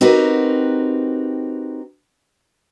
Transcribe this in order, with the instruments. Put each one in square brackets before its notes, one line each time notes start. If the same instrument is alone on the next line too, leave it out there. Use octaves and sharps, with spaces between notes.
[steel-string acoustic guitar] C4 D#4 F#4 G4 A#4 B4